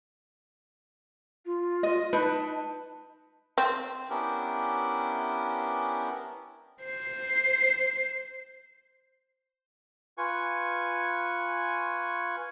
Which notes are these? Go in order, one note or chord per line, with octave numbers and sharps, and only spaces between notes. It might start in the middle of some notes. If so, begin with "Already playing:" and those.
F4
D#5
D#4 B4 A5
C4
B3 C#4 D4 E4 G4 A#4
C5 C7
F4 B4 G#5 C#6